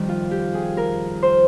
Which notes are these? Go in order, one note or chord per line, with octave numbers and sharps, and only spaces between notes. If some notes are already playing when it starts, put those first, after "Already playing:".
Already playing: F2 D#3 G3
F4
G4
G#4
A#4
C5